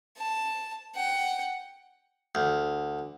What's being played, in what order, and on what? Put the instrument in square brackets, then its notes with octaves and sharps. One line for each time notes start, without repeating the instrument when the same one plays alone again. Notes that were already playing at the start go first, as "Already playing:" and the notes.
[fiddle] A5
F#5 G5
[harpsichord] D2